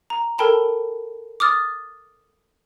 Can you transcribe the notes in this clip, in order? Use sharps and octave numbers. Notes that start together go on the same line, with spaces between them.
A#5
A4 A#4 G5 A5 B5
D6 D#6 F6 A6